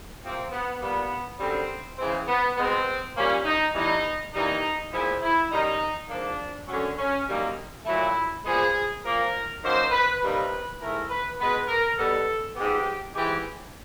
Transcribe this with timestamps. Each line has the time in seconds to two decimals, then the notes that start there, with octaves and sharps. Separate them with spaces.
0.23 C3 F3 A#3 C4
0.51 B3
0.81 A#2 G3 A#3 B3
1.39 F#2 D3 G3 B3 C4
1.98 C#3 E3 G#3 C4
2.27 B3
2.57 B2 G#3 B3 C4
3.15 A#2 G3 A#3 C#4
3.45 D#4
3.74 A2 E3 G3 B3 D#4
4.33 G2 E3 G3 A#3 D#4
4.92 A#2 F3 G#3 B3 E4
5.22 E4
5.51 F#2 D#3 G3 D#4
6.09 G#2 F3 A#3 D4
6.68 F#2 D3 F#3 C#4
6.98 C#4
7.27 F#2 D#3 G3 A#3
7.86 A#2 F#3 A3 E4
8.44 A#2 F3 G#3 B3 G#4
9.03 A#2 F3 A#3 A#4
9.62 F#2 D#3 F#3 A#3 C5
9.91 B4
10.21 C3 D#3 G3 A#3 B4
10.80 G#2 E3 A3 A#4
11.09 B4
11.38 B2 G#3 B3 B4
11.67 A#4
11.97 B2 G3 B3 A4
12.55 G#2 F3 G#3 B3 G4
13.14 G#2 E3 G#3 G4